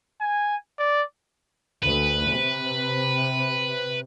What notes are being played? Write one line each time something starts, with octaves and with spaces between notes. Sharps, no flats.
G#5
D5
D2 B4
C3